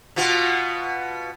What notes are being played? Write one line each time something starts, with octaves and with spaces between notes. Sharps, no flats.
B2 B3 F4